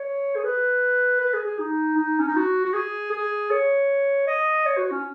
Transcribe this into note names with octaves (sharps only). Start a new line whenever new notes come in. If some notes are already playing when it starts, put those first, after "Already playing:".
Already playing: C#5
G#4
B4
B4
G#4
G#4
D#4
D#4
C#4
D#4
F#4
F#4
G#4
G#4
C#5
D#5
C#5
F#4
C#4